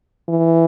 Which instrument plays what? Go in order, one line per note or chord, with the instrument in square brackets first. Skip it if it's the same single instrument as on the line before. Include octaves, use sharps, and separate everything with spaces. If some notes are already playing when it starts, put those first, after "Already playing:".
[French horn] E3